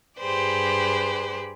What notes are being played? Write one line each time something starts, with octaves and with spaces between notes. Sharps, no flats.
G2 G4 G#4 B4 C5 D5